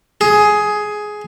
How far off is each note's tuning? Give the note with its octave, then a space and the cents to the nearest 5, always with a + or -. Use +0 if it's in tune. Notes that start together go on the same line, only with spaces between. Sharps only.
G#4 +10